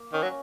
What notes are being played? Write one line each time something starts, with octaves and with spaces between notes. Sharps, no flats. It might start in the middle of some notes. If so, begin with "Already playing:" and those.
Already playing: A#3
D#3 C#4
F#3